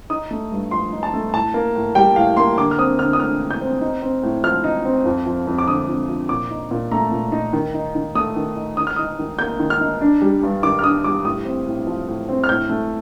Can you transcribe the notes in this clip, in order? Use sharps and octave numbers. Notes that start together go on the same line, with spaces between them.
D#4 D#6
A3
G2
F3 C6
D#4
A5
A3
A2 A5
A#3
A2
G3 G5
A2 F5
A#3 C6
D3 D6
F6
C4 D#6
D3 F6
D#6
A3 F6
D3
G6
C4
D#4
C4
A2
F3 F6
D#4
C4
F2
F3
F2
D6
D3 D#6
F2
F3
A#2 D6
D#4
A#2
A3 A#5
A#2
D#4
D#3
D#4
D#3
A3 D#6
D#3
D#4
D#3 D#6
F6
D#4 D#6
D#3
A#3 G6
D#3
F6
D#4
D4
G3
G2
D#3 D6
F6
D4 D#6
G3 D6
A2 D#6
C4
A2
F3
A2
C4
F6
A2 G6
A3